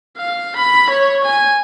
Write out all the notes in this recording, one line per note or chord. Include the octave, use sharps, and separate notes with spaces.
F5
B5
C#5
G#5